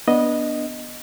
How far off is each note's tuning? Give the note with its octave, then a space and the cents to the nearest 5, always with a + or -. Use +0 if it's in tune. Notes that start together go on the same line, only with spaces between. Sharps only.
B3 -25 D4 +0 D#5 +0